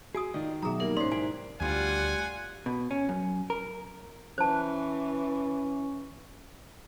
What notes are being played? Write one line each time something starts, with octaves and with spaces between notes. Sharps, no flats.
F#4 G#4 G#5 D#6
D#3 F4 D5 D#5
B2 F#3 G#4 E5 A#5 D#6
G3 A#3 D#4 A#4
G#2 C#4 D#4 C5 D5 C6
E4 G4 A#4 G#5
D2 G3 F4 F#5 G#5
B2
C#4
F#2
A#4
E3 C#4 C5 A5